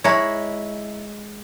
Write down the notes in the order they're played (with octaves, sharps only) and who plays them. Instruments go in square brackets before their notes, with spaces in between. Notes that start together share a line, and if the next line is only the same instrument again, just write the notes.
[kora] G#3 C#5 [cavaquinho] E4 A#5 B5